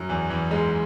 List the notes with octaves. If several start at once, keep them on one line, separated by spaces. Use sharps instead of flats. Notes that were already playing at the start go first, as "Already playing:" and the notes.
Already playing: F#2 F#3
E2 E3
E2 E3
G#2 G#3